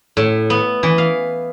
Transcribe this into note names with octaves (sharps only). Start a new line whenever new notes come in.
A2
B3
E3
F5